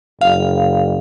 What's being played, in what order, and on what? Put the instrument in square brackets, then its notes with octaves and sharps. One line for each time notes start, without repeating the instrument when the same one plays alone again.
[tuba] F#1 [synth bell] F5